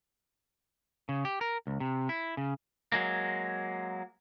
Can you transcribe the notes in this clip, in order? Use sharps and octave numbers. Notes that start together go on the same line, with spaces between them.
C#3
G4
A#4
C#2
C3
E4
C#3
F#3 G#3 A#3